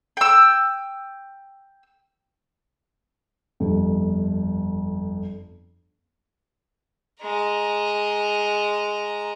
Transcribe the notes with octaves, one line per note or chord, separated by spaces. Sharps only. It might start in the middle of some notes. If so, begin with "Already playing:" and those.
G5 E6
G1 F2
G#3 A#5